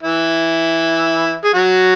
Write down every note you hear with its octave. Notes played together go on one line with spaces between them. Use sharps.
E3 E4
G#4
F#3 F#4